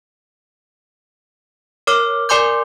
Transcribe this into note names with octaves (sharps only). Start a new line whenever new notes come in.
A#4 C#5 D6 F6
A#4 D5 G#5 C6 D6 G6